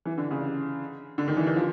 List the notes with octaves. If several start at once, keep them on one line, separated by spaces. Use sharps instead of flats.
E3
D3
C#3
D3
D#3
E3
D#3
F3